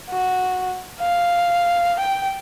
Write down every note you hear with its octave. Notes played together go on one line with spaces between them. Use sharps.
F#4
F5
G5